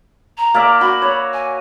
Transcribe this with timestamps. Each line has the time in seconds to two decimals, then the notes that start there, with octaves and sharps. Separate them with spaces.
0.38 A#5
0.54 A#3 D5 E5
0.81 F#4 B5
1.02 C#5
1.33 G#5